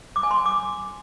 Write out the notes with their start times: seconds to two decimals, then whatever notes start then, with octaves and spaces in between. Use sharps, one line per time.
0.16 D6
0.23 G#5
0.31 C6
0.38 G#5
0.46 D6